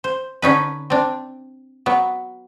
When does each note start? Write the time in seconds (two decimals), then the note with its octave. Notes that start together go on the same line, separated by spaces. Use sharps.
0.04 C5
0.42 D3 C#4 D#4 B4
0.90 C4 D4
1.86 F#3 B3